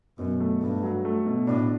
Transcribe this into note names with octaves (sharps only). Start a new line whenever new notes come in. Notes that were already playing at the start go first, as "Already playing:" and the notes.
F#2 B2
A3
G2 A3
F#3
A3
B2
A2 D4